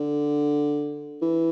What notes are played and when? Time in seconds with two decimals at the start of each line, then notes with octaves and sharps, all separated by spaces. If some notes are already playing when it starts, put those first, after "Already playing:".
Already playing: D3
1.22 E3